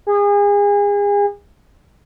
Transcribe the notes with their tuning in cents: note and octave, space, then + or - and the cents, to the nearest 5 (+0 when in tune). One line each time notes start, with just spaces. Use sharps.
G#4 -35